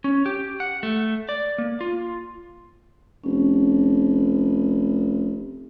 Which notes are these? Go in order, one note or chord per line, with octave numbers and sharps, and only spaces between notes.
C#4
G4
F#5
A3
D5
A#3
F4
F1 C#4